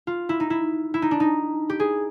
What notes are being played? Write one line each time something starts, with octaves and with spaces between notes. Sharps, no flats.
F4
E4
D#4
E4
E4
D#4
D4
D#4
G4
G#4